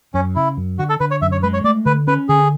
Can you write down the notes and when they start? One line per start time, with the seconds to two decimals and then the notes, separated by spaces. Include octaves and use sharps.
0.14 F#2 C#4
0.36 C#3 E4
0.57 F#2
0.79 D3 F#4
0.89 A4
1.00 D3 B4
1.11 C#5
1.22 F#2 E5
1.32 C#5
1.43 G#3 B4
1.53 C#5
1.64 A3 D5
1.86 D3 B4
2.07 C#4 B4
2.29 D3 G#4